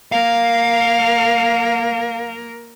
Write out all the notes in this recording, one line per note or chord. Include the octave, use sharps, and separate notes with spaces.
A#3 A#4 F5